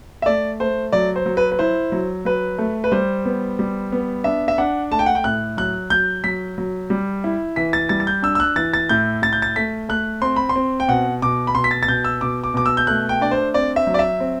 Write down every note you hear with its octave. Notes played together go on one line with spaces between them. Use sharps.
E5
A3 D5
A3 C5
F#3 D5
C5
F#3
B4
B4
E4 C5
F#3
F#3 B4
A3
B4
G3 C5
B3
G3
B3
D4 E5
E5
D4 F#5
A3 A5
G5
F#5
G5
A2 F#6
F#3 F#6
F#3 G6
F#3 B6
F#3
G3
E4
E3 B6
A6
G3 A6
A6
G6
D4 E6
E6
F#6
E3 A6
A6
A2 G6
A2 A6
G6
A6
A3 B6
A3 F#6
C4 C6
B5
C6
C4
G5
B2 F#5
B2 D6
B5
B2 C6
B6
A6
A6
B2 G6
E6
B2 D6
D6
B2 D6
E6
G6
A3 F#6
G5
D4 D5
C5
C4 D5
E5
F#3
D5
E5
C4